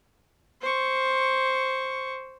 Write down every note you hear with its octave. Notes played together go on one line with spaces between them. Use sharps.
C5 C#6